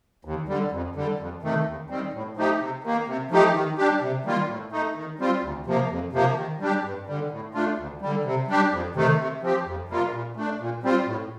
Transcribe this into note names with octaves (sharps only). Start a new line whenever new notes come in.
D#2
D3 G3
F2
D3 G3
F2
C3 D#3 A3
D#2
D#3 G3 C4
A2
F3 A3 D#4 G4
C3
D#3 A#3
C3
F3 A3 D#4 G4
D#3
G3 D4 G4
C3
D#3 G3 A#3 F4
A2
A3 D#4
D#3
G3 C4 F4
D2
C3 F3 A#3
F2
C3 F3 A#3
D#3
G3 D4 G4
G2
D3 G3
A2
A3 D4 F4
D2
D3 G3
C3
G3 D4 G4
F2
C3 D#3 A3
C3
F3 C4 G4
F2
C3 G3 A#3 F4
A#2
A3 D4
A#2
G3 C4 F4
A2